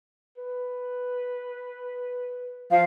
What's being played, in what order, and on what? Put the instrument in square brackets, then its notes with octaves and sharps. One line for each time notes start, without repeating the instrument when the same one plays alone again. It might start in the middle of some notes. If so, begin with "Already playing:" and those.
[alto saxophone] B4
[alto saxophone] F3 [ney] F5